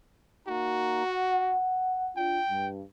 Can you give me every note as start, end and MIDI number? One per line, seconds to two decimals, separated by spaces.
0.48 1.06 58
0.48 1.06 63
0.48 1.57 66
0.48 1.06 82
1.06 2.12 78
2.17 2.40 62
2.17 2.40 65
2.17 2.69 79
2.50 2.82 43